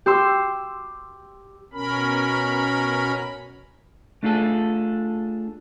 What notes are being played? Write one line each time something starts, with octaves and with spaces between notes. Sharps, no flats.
G4 C6 E6
B2 C#4 A#4 B5
A3 D4 F4 G#4 A4